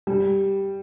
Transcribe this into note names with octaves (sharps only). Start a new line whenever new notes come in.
G3